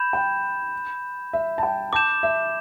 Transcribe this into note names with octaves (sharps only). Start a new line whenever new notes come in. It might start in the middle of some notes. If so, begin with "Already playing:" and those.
Already playing: B5 G6 E7
G5
E5
A5
G5
A5 D6 G6 E7
E5